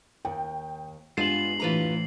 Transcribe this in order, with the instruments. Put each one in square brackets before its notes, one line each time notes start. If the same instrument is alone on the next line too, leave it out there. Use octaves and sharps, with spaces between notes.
[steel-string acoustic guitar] D#2 [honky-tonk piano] G5
[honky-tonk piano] G2 G#3 E7 [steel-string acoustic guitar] B3 F4 G#5 [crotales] C7 F#7
[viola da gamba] A2 E3 [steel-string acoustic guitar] F4 B4 A#5